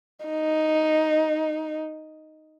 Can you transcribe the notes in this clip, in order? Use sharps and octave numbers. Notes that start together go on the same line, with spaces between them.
D#4